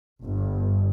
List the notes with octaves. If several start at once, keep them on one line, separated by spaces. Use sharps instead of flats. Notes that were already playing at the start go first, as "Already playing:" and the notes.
G1